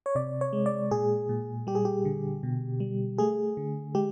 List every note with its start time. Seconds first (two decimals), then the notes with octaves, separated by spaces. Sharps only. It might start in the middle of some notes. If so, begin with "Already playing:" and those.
0.06 C#5
0.15 C3 D5
0.41 C#5
0.53 G#3
0.66 D5
0.91 A#2 G#4
1.29 A#2
1.67 G3 G4
1.75 G#4
1.85 G4
2.05 D3
2.43 B2
2.80 G3
3.18 A3 G#4
3.57 D3
3.95 G#3 G4